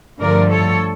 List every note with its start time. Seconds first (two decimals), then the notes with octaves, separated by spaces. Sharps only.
0.21 G2 D3 F3 A3 A#4 D5
0.51 A4 C#5